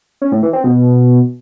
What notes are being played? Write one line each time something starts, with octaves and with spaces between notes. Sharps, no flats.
C#4
A2
E3
C4
B2